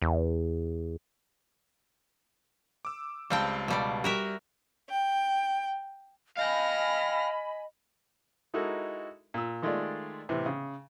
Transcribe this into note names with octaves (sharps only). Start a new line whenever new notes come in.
E2
D6 E6
C#2 G3 C4 F5 G5 A5
B2 G3 D5
G3 F#4 A#4 E5
G5
D#5 F5 G5 G#5 B5 F6 A#6
G#3 D#4 E4 F#4 A4 A#4
A#2 E6
D#3 G#3 A3 F4 D5
A2 C3 E3
C#3